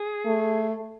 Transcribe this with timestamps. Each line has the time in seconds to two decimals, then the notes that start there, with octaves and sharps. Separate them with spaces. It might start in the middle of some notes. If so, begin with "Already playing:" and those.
Already playing: G#4
0.26 A3